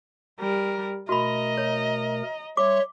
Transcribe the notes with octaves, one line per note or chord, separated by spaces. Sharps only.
G3 A#4
B2 A3 F#4 A#4 D#5 A#5 B5
C#5
G3 C#5 E5 C6 D6